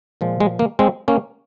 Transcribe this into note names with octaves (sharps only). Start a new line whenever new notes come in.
A#2 F3 G#3
G#3
A#3
G#3 C4
A#3 C#4